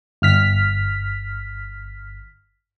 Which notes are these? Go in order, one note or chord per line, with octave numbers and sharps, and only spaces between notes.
G1 F6 B6